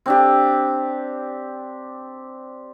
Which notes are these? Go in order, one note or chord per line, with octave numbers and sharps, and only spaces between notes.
C4 D4 G4